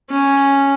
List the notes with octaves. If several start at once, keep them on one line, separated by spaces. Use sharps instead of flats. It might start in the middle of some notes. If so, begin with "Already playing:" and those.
C#4